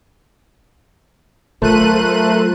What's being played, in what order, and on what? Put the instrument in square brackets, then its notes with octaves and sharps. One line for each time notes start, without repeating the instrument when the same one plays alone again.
[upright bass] F#3 [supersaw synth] A3 F#6 D#7 [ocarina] F4 [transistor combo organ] A4 A#4 C5